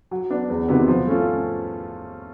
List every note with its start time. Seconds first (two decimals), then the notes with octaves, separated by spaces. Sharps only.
0.11 F#3
0.30 B3 D4
0.50 E2
0.68 C3 D#3 F#3 B3
0.88 F3
1.07 A3 C#4 F4